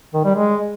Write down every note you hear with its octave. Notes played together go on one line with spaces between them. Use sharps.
D#3
G3
G#3